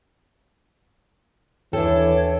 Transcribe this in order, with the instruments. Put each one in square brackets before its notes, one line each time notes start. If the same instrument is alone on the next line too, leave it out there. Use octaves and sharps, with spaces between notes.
[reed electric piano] D#2 G5 [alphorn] E3 [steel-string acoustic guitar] D4 A4 [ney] C#5